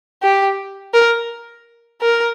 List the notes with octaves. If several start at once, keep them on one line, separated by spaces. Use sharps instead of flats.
G4
A#4
A#4